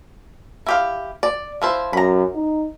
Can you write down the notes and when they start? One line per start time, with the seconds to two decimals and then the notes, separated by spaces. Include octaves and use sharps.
0.66 E4 G4 F5
1.23 D5
1.62 F3 E4 C5
1.93 F#2 A#5 B5
2.35 D#4